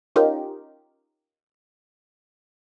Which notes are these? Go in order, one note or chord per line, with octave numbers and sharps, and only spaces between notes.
C#4 D#4 F4 G4 A#4